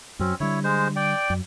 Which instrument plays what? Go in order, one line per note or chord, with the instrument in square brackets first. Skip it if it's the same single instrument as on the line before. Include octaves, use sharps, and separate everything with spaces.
[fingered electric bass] F#2 F#3 [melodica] C4 C#4
[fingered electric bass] D3 G3 [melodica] E4 C#5
[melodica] G#3 C5
D5 G5
[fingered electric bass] F#2